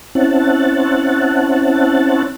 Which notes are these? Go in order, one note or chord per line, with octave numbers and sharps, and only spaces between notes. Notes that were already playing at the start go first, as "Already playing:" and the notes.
C4 C#4 E4 F#5 A5